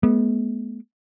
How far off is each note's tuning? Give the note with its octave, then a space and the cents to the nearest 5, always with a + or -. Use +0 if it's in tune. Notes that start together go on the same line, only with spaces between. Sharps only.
G#3 +40 B3 -30